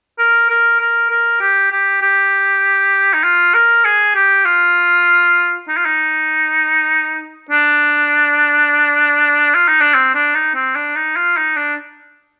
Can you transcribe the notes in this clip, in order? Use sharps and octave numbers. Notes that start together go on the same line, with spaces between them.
A#4
A#4
A#4
A#4
G4
G4
G4
D#4
F4
A#4
G#4
G4
F4
D#4
F4
D#4
D4
F4
D#4
D4
C4
D4
D#4
C4
D4
D#4
F4
D#4
D4